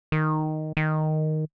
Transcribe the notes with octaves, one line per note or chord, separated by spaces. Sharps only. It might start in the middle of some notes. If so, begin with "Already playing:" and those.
D#3
D#3